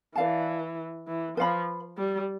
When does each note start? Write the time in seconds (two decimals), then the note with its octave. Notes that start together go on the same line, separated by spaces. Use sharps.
0.15 E3 B4 D5 F5 A5
1.07 E3
1.37 F3 B4 F5 B5
1.98 G3